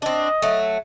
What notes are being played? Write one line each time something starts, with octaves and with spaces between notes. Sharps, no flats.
C4 D4 D#5
F#3 A3